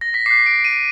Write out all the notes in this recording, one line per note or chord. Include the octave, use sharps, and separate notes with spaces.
A#6
B6
D6 F#6 C7
D7
D#7